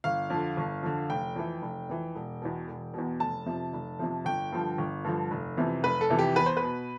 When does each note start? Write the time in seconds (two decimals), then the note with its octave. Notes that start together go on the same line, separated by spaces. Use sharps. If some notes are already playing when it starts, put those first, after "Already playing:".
0.04 G1 F5
0.30 F2 D3
0.57 G1
0.83 F2 D3
1.10 F1 G5
1.36 F2 E3
1.62 F1
1.89 F2 E3
2.15 E1
2.42 E2 B2
2.68 E1
2.94 E2 B2
3.20 F1 A5
3.46 F2 C3 F3
3.73 F1
3.99 F2 C3 F3
4.25 G1 G5
4.52 G2 D3 F3
4.78 G1
5.04 G2 D3 F3
5.31 F1
5.57 F2 C3 E3
5.83 F1 B4
6.01 A4
6.10 F2 C3 E3
6.19 G4
6.36 E2 B4
6.46 C5
6.57 B4
6.62 B2